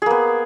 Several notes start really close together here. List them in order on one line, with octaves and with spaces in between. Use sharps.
G#4 A#3 B3